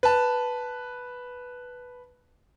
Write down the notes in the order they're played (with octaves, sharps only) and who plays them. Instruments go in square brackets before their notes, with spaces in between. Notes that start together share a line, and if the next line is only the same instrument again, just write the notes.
[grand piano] B4 A5